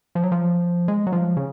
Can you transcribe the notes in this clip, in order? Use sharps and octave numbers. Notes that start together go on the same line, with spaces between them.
F3
F#3
F3
G#3
F#3
F3
C#3